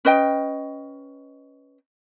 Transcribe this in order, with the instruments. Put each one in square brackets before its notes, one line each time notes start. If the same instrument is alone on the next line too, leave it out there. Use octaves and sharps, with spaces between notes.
[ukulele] C#4 B4 D#5 G5